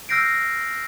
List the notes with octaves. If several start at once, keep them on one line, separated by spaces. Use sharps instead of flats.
E6 F6 G6 A#6 C7 D7